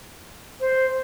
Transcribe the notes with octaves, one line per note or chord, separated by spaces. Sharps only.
C5